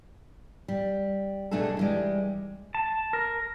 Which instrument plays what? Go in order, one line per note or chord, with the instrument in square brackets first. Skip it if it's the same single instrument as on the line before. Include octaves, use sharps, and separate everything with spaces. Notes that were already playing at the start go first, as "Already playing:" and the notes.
[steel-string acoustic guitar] G3
B2 G3 A3 D4 G#4 A4
E3 G3 G#3
[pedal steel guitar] A5
A#4